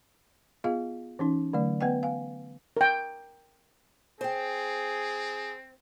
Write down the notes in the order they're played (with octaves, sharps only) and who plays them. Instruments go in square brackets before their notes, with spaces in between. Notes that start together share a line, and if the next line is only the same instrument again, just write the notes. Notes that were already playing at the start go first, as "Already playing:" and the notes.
[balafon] B3 F4 G#4 D#5 F5
E3 C#4 D#4
D3 F#3 A3 D5
B3 B4 D#5 F#5 G5
F5 G#5
[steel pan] A#4 G5
[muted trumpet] C4 [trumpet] G#4 [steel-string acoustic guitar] C5 G5